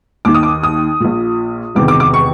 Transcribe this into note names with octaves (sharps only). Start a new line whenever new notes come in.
D#2 D#3 D6
D#6
D6
D#6
A#1 A#2
E1 E2 C3 D#3 D6
D6
D6
C#6